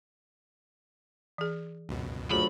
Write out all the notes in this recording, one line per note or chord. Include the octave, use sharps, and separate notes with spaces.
E3 G#4
C#2 F#2 B2
D2 F#3 A3 F4 F#4 G#4 B5